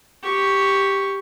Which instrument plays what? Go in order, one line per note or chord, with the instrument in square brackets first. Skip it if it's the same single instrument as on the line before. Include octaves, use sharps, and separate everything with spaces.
[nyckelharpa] G4 C#6